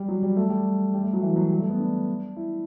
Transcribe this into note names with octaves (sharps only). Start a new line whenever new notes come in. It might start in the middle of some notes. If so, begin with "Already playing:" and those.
Already playing: G3
F#3
G3
A3
G3
G3
A3
F#3
E3
F#3
G3
A3
B3
D4
E4